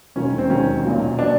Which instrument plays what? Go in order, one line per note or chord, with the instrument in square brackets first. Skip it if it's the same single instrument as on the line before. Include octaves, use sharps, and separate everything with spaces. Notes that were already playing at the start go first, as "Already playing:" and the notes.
[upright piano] E1 D#2 D#3 F#3 C#4
C4
E1 D#2 D#3 F#3 C#4
B1 A#2 F#3
A#2 F#3 D4